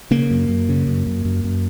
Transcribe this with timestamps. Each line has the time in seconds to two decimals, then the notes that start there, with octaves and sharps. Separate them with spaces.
0.11 C#3 A#3
0.31 F#2
0.49 F#2
0.69 C#3
0.87 F#2
1.07 F#2
1.25 F#2
1.44 F#2